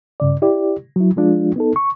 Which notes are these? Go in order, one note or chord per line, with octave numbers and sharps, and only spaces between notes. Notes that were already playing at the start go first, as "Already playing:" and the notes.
G2 C#3 D5
E4 G4 D5
F#3 E4
F3 G#3 D4 F4
B3 D#4 A4
C#6